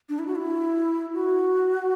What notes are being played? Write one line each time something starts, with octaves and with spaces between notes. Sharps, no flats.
D4
E4
F#4
E4
F#4